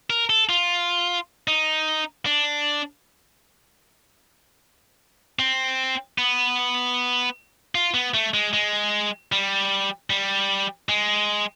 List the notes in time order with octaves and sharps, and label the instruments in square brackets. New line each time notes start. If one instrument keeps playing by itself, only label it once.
[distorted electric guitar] A#4
A4
F4
D#4
D4
C4
B3
F4
B3
A3
G#3
G#3
G3
G3
G#3